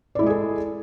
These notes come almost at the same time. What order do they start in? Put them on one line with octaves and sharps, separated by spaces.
D5 E4 G#3 G#4 A4